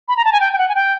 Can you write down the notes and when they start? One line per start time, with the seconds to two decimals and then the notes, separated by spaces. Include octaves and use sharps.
0.08 B5
0.17 A#5
0.25 A5
0.32 G#5
0.40 G5
0.53 G5
0.58 F#5
0.69 G#5
0.75 G5